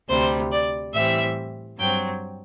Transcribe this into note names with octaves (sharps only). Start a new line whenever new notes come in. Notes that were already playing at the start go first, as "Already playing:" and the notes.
D2 C3 G3 C5
D5
A2 E3 G3 C4 E5
G2 F#3 C4 G5